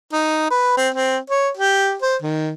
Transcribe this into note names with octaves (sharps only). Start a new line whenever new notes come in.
D#4
B4
C4
C4
C#5
G4
C5
D#3